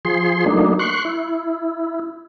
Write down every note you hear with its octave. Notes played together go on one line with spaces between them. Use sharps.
F3 G#4 C6
F#3 A3 A#3 D4 D#4
C6 C#6 F#6
E4